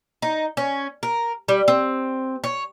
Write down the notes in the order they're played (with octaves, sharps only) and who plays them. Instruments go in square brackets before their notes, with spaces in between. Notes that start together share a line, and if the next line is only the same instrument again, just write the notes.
[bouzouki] D#4
C#4
A#4
G3
C4
C#5